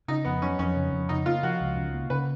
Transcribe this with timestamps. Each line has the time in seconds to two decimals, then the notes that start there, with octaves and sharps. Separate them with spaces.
0.08 C#3 D#4
0.24 F2 B3
0.42 F#3 C#4
0.59 F2 C#4
0.76 C#3
0.93 F2
1.09 C#3 D#4
1.26 A#3 F4
1.43 F3 F#4
1.60 C#2
1.77 C#3
1.94 A#3
2.10 C#3 B4